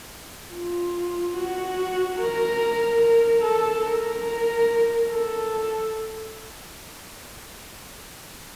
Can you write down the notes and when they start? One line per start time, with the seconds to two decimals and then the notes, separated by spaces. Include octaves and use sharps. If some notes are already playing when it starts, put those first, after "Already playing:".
0.54 F4
1.37 F#4
2.20 A#4
3.02 A#4
3.43 A4
3.85 A#4
5.09 A4